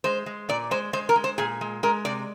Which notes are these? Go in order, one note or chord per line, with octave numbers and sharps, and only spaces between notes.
G#3 C5
G#3
A#2 D5
G#3 C5
G#3 C5
A#4
G#3
C5
A#2 G#4
G#3
G#3 A#4
C3 D5